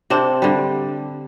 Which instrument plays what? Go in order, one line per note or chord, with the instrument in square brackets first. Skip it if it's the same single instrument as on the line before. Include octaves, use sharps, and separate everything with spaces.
[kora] C3 C4 D4 A4
D3 G3